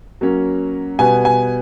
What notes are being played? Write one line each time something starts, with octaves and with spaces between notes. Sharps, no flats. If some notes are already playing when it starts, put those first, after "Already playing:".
F#3 A#3 C#4
B2 G3 B3 G#5
G#5